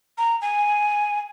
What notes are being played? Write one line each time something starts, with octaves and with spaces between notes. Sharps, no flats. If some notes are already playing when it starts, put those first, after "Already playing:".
A#5
G#5